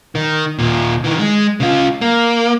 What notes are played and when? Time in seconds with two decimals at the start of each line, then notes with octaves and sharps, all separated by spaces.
0.15 D#3
0.59 D#2 A#2
1.04 D#3 E3
1.19 G#3
1.60 C#3 F4
2.01 A#3